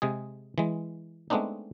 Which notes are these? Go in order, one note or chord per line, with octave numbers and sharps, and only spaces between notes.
C3 G#3 G#4
E3 G#3
G#3 A3 B3 C4 D4 D#4